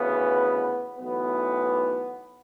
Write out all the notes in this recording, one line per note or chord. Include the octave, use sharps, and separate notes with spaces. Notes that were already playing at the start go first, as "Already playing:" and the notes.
Already playing: D2 C#3 E3 B3
B1 A2 E3 B3